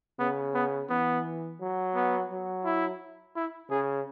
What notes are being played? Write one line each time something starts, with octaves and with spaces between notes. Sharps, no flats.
C#3 B3
B3
E3 B3
F#3
B3
F#3
E4
E4
C#3 G#4